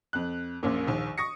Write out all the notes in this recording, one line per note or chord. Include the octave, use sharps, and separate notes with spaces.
F2 F#6
A#1 F#2 A#2
A#1 D#2
C#6 D#6 A#6 C#7